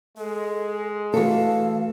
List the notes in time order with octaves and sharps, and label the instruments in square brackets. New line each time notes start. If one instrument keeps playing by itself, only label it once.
[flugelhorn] G#3 [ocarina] A4
[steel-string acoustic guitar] E3 A4 [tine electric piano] A3 F#4 [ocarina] F5